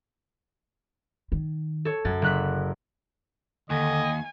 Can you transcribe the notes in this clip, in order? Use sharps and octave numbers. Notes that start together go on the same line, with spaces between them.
D#3
A4 C#5
F#2 D3 A6
F#1 F#6 B6
D#2 D3 D#5 G#5